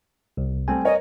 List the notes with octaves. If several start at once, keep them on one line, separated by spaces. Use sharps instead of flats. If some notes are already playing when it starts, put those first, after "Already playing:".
C2
G3 A3 C4 G#5
A#4 C#5 D#5